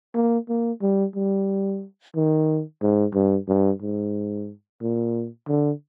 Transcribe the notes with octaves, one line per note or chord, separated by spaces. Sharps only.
A#3
A#3
G3
G3
D#3
G#2
G2
G2
G#2
A#2
D3